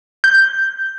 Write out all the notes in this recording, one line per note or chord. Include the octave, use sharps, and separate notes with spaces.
G6